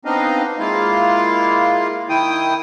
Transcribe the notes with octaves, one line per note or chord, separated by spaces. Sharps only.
B3 C4 D4 D#4 D#5 F5
G#3 A#3 E4 F4 F5
D#3 E4 G5 D#6